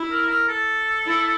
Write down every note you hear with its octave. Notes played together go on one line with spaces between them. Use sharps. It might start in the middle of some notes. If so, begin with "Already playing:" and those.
Already playing: E4
A#4
A#4
A4
E4